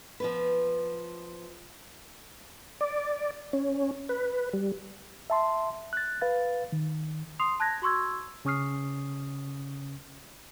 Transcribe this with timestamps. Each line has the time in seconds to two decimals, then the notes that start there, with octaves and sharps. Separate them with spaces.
0.20 F3 B3 B4
2.81 D5
3.53 C#4
4.09 B4
4.53 G3
5.30 E5 A5 C6
5.93 F#6 A6
6.21 B4 F5 A6
6.72 D#3
7.39 C6 D#6 C7 F7
7.60 A5 F#6 G#6 A#6
7.82 F#4 C6 C#6 E6 G#6
8.45 C#3 C#4 C#6 D#6 F6 C7